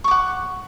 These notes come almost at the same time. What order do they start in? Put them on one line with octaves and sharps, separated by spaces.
C#6 D6 F#5